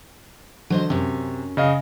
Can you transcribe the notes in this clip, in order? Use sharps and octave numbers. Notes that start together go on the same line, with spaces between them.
D3 F#3 C5 D#5
F#2 C3 C#4
C#3 D#5 F5